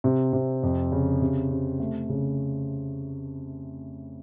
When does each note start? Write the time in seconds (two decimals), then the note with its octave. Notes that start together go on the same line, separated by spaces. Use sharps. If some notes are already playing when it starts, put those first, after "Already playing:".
0.04 C3
0.33 C3
0.63 F2
0.92 C#3
1.21 C3
1.51 C3
1.80 A3
2.09 C#3